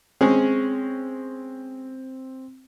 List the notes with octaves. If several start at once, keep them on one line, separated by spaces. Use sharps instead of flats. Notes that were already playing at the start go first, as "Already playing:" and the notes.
G#3 C4 C#4 G#4